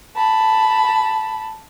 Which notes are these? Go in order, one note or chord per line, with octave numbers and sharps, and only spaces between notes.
A5 B5